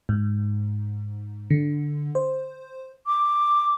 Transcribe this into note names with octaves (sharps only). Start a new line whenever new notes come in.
G#2
D3
C5
D6